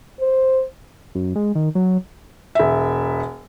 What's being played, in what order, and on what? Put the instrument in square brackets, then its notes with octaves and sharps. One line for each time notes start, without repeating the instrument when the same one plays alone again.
[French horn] C5
[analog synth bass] F#2
G#3
D#3
F#3
[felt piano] E1 E5